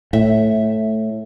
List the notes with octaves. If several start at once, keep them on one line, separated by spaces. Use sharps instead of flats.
A2 E5